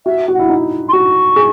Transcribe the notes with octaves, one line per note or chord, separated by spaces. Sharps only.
F#4 E5
F#4
E4 F#5
D#4
C6
F#4 C#6
G#4